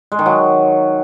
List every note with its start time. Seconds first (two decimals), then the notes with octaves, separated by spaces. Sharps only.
0.12 G#3
0.19 D#3
0.26 F#3